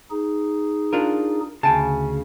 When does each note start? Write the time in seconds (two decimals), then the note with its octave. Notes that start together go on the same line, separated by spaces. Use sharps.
0.11 D#4 G#4
0.93 D4 F4 A#4
1.63 D2 C#3 G5 A5